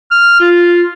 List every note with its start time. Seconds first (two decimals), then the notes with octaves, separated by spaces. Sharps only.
0.11 F6
0.40 F4